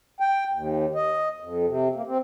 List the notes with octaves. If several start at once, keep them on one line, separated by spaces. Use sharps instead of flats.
G5
D#2
D#5
F2
C3
A#3
C4